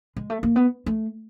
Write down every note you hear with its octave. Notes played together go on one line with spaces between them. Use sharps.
G#3
A3
A#3
B3
A3